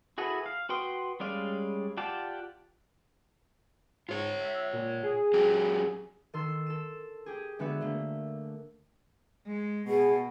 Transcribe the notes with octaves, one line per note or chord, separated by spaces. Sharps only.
E4 F#4 G#4 A4 B4
F5
F#4 B4 G5 C6 D#6
G3 G#3 C#4 D5 F5
F4 G4 D5 F#5 A5
G#2 F4 C#5
E5
A#2
G#4
F#3 C#4 G4
D#3 A4 C6 E6
A4 E7
G4 G#4
D3 G#3 B3 F#4 E5 C#7
D3 A3 A#3
G#3
B2 G#4